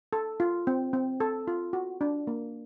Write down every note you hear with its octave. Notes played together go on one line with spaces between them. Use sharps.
A4
F4
C4
C4
A4
F4
F#4
D4
A#3